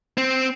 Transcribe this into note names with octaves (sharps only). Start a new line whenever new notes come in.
C4